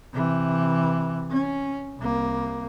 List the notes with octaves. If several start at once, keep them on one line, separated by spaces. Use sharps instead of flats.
C3 E3
C#4
C2 A#3